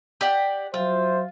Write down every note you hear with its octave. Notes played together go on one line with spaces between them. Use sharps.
G4 D5 F#5
F#3 F4 C5 E5